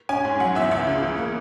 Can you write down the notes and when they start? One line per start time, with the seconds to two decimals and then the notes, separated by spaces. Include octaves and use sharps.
0.09 C#4 G#5
0.25 G#2
0.40 F#3 F#5
0.55 E2 E5
0.71 C#2 E5
0.87 C#3
1.03 E3
1.18 A#3